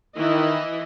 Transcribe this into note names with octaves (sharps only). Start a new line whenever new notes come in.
D#3 E3 E4 D#5